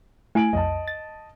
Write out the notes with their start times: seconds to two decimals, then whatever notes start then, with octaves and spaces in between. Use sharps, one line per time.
0.35 A3 E4 G#5 D7 F#7
0.53 B1 F2 D#5 A5
0.88 A6